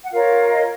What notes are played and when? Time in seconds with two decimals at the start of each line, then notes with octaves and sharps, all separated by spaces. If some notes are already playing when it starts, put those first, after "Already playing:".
0.03 F#5
0.11 F4 A#4 C#5 F5
0.52 D#5